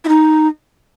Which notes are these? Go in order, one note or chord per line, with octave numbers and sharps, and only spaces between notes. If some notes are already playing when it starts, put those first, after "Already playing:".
E4
D#4